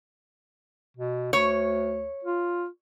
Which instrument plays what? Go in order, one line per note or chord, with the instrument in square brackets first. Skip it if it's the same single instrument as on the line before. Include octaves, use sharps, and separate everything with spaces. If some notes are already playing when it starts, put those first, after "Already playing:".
[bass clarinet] B2
[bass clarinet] D2 [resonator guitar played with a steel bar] C#5
[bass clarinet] F4